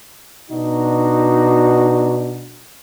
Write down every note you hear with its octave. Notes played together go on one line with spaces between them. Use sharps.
B2 D4 D#4 F#4